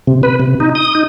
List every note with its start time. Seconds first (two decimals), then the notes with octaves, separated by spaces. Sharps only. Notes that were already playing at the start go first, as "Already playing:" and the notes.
0.07 C3
0.23 B4
0.40 C3
0.60 D#4
0.75 D#6
0.95 D#4